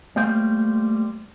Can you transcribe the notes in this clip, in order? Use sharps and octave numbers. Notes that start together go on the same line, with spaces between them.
G3 A3 A#3 C5 G5